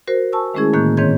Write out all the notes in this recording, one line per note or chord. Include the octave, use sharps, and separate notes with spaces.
F#4 A#4 C5
G#5 A5 C#6 E6
D#3 G#3 A3 C#4 E4 G#4
A2 D3 D#3 A#3 F#6 G6
G#2 D#3 C4 C#5 G6 G#6